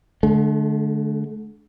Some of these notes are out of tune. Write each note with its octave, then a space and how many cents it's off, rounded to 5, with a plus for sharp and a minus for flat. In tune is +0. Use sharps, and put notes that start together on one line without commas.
D3 +0 A3 -45